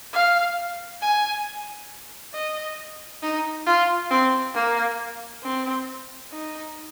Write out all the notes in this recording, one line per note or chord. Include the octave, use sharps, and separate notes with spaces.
F5
G#5
D#5
D#4
F4
C4
A#3
C4
D#4